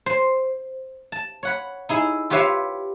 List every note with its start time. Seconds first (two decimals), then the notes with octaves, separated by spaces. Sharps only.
0.06 C5
1.12 A5
1.43 C#5 F#5 B5
1.89 D#4 E4 G#4
2.30 F4 G4 B4 C#5 E5 F5